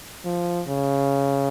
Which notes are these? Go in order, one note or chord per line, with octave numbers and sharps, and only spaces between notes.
F3
C#3